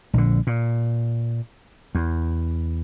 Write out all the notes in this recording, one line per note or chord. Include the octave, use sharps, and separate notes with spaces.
A#1 D3
A#2
E2